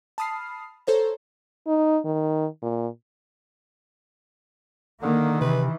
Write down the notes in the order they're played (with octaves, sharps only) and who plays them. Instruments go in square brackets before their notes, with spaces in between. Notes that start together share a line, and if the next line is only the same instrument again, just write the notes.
[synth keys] A5 B5 D#6 F6 C7
A4 C5 C#5 A#5
[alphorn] D#4
D#3
A#2
[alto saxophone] D3 [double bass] D#3 [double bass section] A#3
[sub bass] C3 [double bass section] E3 [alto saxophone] B4